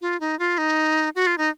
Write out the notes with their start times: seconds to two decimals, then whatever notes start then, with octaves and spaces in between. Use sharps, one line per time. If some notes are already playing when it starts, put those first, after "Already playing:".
0.01 F4
0.20 D#4
0.39 F4
0.58 D#4
1.15 F#4
1.27 F4
1.38 D#4